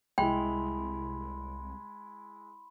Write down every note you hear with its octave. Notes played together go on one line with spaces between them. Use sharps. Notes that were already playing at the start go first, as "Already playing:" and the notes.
C2 G#3 E4 G5 B5 C6